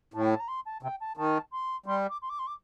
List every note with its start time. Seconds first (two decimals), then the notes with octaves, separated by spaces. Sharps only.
0.14 A2 A5
0.22 G5
0.31 A5
0.40 A#5
0.48 C6
0.65 A5
0.83 C3 G5
1.00 A5
1.17 D#3 A5
1.52 C6
1.86 G3 C6
2.09 D6
2.22 C6
2.29 D6
2.39 C6
2.47 D6